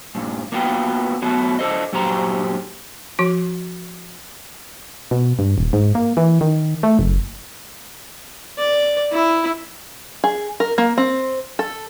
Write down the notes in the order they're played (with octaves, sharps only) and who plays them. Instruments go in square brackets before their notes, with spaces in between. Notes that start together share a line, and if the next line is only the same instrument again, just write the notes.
[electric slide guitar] G2 A#2
A#3 B3 F4 F#4 B4 G5
F#3 A3 B3 F#4
D4 A4 C5 D#5
G2 A#2 F#3 G4 C5 A#5
[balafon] F3 F#4
[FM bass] B2
G2
D#1
G#2
A#3
E3
D#3
A3
F#1
[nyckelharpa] D5
E4
[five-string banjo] G#4
A#4
A#3
C4
A4